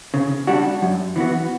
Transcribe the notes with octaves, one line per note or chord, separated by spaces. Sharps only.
C#3
G3 D4 F#4
F#2
E3 B3 F#4